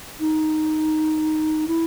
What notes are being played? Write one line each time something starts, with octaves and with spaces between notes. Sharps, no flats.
D#4
E4